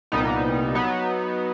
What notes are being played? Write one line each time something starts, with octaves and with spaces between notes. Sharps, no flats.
C2 A#2 G3 B3 D#4
F#3 B3 D#4